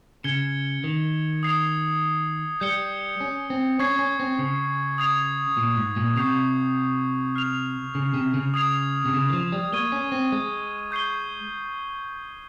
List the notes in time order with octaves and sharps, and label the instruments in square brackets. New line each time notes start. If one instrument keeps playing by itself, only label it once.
[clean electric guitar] C#3 [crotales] G#6 C#7 G7
[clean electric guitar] D#3
[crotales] D#6 G#6 C7 F7
[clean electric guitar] G3 [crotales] G6 C#7 G7
[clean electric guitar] C#4
C4
[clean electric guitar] C#4 [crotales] C#6 G#6 C7
[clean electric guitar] C#4
C4
C#3
[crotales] D#6 G#6 C7 F7
[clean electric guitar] A#2
G#2
A#2
[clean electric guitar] C3 [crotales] C#6 G6 C7 F7
[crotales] F6 C7 F7
[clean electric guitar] C#3
C3
C#3
[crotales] D#6 G#6 C7 F7
[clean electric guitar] C3
C#3
D#3
F3
G3
[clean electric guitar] A#3 [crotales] C#6 G#6 D#7 G7
[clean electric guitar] C#4
C4
G#3
[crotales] C#6 G6 C7 D#7 G7